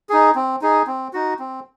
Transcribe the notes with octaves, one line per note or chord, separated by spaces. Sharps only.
D#4 G#4
C4
D#4 G#4
C4
D#4 F#4
C4